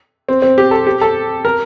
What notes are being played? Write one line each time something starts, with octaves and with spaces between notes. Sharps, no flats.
C4
C4
G4
A4
G4
A4
A#4